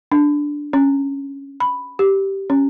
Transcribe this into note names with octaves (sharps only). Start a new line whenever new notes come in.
D4
C#4
B5
G4
C#4